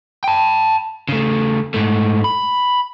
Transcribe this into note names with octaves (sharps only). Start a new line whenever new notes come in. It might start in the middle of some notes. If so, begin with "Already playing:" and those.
G5 A5
C#3 A3
G#2 A3
B5